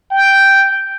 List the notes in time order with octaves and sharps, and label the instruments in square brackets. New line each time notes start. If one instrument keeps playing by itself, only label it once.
[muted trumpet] G5